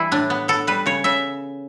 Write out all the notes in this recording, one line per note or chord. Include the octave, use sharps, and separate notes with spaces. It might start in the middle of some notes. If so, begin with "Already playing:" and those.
Already playing: E3 G3 E4
A2 D4
B3
B3 A4
G3 B4
C#3 C#5
C#3 E5